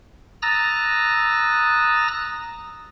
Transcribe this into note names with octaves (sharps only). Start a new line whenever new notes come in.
A#5 D#6 E6 F#6 A6 A#6